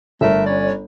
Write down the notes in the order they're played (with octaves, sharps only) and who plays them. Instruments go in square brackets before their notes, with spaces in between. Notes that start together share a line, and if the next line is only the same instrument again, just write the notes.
[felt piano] G1 [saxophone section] A3 A#4 E5
[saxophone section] C#4 C#5 D5